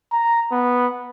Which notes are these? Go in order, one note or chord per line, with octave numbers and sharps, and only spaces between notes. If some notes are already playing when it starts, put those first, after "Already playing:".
A#5
B3